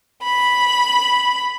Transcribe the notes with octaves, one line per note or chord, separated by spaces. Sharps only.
B5